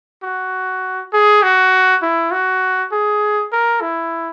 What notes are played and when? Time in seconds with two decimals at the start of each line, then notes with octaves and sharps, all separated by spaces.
0.23 F#4
1.13 G#4
1.43 F#4
2.02 E4
2.32 F#4
2.92 G#4
3.52 A#4
3.81 E4